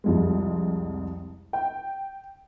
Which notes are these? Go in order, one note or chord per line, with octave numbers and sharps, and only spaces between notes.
C2 F2 G#3
G5